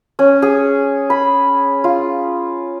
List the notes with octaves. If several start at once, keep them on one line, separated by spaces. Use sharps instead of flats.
C#4
G#4
B5
F4